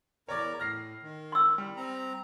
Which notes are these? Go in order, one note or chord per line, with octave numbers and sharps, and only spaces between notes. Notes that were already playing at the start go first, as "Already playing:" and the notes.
E2 A#4 C#5 D5 A#5 D6
A2 F6 A#6 C7
D#3
C6 E6
G3
C4 A#5